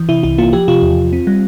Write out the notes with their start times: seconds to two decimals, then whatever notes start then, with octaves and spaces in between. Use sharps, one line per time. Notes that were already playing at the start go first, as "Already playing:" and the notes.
Already playing: E3
0.09 C3 E4
0.23 C2 E4
0.38 A#3 F4
0.53 F3 G4
0.68 C3 F4
0.82 E2
0.98 E2
1.13 C4
1.27 G3